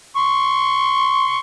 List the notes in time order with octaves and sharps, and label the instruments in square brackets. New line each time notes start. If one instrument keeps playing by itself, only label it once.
[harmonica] C6 C#6